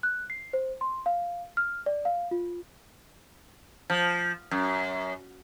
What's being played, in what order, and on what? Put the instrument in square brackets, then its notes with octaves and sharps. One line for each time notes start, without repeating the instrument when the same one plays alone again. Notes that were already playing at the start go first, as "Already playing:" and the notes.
[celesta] F#6
C7
C5
C6
F5
F6
D5
F5
F4
[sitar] F3
F#2